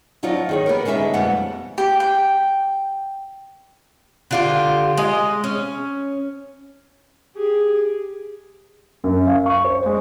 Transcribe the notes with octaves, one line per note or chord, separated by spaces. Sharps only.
F3 F#3 D#4 F4 D5 D#5
D#3 G#4 C#5
B3 G4 A#4
B2 D3 G#3 D#4 C5 E5
F2 G3 A3 B3 F#5
G4
G5
D3 F4 G4
G#3 D#5
C#4
G4 G#4
F#2
F5
C#6
C5
G#3